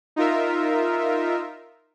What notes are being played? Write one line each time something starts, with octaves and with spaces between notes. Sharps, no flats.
D#4 F4 A#4 E5